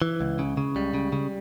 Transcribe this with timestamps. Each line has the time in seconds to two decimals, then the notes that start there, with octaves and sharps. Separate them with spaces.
0.02 E3
0.21 C#2
0.39 C#3
0.57 C#3
0.76 C#2 G3
0.94 C#3
1.12 C#3